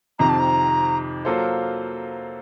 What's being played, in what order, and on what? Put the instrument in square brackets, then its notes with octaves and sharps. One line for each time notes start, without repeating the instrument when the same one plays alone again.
[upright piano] F2 C3 D#3 [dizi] A#5
[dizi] A5
A#5
[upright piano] F#3 A#3 F4 A4 C5